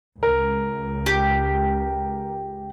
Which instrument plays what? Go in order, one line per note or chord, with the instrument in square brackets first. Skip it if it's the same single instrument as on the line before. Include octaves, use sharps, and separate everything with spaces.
[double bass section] C#2 [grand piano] A#4
[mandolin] G4